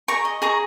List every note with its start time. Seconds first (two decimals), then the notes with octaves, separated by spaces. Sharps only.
0.08 G#4 A#5 C#6
0.25 D#5
0.42 G#4 A#5 C#6